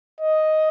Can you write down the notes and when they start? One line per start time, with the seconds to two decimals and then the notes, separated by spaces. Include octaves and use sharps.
0.21 D#5